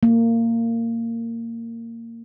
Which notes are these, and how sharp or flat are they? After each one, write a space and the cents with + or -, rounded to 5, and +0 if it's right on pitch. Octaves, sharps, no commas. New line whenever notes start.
A#3 -20